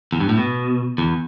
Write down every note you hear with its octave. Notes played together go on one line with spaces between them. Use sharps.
E2
G2
A2
B2
E2